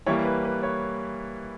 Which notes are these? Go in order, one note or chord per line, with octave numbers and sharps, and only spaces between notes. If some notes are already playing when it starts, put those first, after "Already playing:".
E3 G3 A#3 C#5
B4
B4
C#5